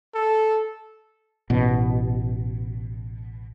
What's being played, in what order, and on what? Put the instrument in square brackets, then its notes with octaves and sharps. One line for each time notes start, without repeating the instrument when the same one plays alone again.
[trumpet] A4
[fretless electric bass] A1 B2